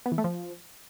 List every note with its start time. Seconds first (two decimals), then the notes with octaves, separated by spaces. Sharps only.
0.06 B3
0.12 E3
0.18 A3
0.24 F3